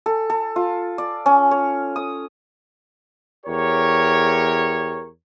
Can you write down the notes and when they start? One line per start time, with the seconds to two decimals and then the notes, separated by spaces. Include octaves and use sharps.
0.06 A4
0.30 A4
0.56 F4
0.98 D5
1.26 C#4
1.51 C#5
1.96 D#6
3.45 E2 G4 A#4 C#5